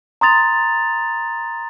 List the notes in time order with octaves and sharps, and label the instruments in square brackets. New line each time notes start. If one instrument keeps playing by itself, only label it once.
[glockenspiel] A#5 C6 D#6 A6 F7